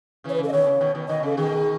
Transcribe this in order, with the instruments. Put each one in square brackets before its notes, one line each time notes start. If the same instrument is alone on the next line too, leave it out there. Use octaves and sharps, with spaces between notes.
[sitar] C#3 E3 [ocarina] C#5
[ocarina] B4
[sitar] C#3 [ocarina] A4
[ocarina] D#5
[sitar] B2 D#3 [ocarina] C#5
[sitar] C#3
B2 D#3
B2 D#3
[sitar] B2 D#3 [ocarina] D#5
[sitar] C#3 [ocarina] A4
[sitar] B2 D#3 [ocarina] G#4